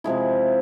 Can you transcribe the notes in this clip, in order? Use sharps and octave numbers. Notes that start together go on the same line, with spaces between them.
C3 F3 G#3 E4